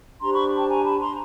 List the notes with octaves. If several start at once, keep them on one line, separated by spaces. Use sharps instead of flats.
D4 G4 C5 A#5 C6
B5 C#6
G5 A5
G#5 A#5
A5 B5
A#5 C6